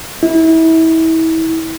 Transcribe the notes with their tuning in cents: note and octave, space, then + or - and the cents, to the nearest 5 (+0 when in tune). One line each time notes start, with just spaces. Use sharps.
E4 -30